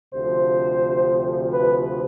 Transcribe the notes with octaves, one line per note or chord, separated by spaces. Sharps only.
D2 C3 F3 C5
B4